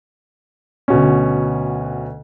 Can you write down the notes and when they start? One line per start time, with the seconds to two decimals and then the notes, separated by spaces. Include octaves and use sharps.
0.88 D2 B2 C#4